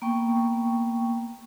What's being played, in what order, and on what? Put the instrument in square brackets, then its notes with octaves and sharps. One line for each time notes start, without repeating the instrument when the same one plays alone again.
[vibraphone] A#3 B3 G5 C#6